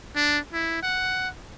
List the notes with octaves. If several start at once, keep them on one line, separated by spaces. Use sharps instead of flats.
D4
E4
F#5